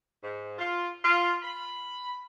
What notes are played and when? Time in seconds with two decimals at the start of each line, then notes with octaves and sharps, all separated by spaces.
0.22 G#2
0.58 F4
1.04 F4
1.42 B5